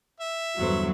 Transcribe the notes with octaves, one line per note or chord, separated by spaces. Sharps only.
E5
E2 G2 D3 F#3 C5